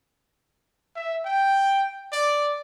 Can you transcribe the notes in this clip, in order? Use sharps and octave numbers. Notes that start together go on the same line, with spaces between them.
E5
G5
D5